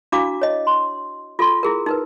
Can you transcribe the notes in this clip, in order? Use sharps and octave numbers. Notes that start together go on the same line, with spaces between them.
D4 E4 F#4 F5 D6
C#5 D#5
C6
F4 A4 C6
E4 G#4 A#4
D#4 A#4 B4